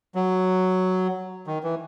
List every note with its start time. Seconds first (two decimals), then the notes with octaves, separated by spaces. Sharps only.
0.15 F#3
1.47 D#3
1.63 E3